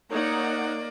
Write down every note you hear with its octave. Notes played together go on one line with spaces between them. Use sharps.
A#3 D#4 C#5 D5 F#5